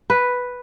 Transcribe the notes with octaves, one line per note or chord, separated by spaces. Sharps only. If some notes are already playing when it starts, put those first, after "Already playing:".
B4